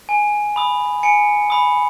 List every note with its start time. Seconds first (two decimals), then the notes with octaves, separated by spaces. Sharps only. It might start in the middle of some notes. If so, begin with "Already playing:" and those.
0.09 G#5
0.56 B5 D#6
1.03 G#5 C#7
1.50 B5 D#6